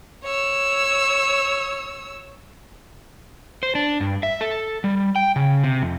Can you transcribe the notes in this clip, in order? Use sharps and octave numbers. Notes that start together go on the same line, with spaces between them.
C#5 E6
C5
D4
G2
E5
A4
G3
G5
C#3
C3
F2